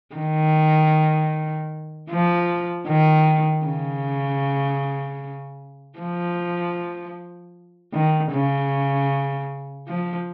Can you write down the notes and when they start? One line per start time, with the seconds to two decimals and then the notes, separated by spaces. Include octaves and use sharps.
0.16 D#3
2.10 F3
2.88 D#3
3.66 C#3
5.99 F3
7.94 D#3
8.32 C#3
9.88 F3